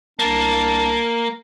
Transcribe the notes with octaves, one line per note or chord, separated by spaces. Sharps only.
C2 A#3 D4 A5